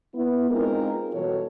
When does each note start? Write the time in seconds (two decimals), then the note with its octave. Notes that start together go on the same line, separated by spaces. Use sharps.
0.14 B3 E4
0.49 G#3 C4 D#4 F4 A#4
1.13 B2 E3 G3 F#4 A4 C#5